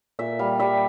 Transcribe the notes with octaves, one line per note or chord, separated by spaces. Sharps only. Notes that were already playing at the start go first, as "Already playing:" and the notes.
A#2 E5
G3 F5
G3 E5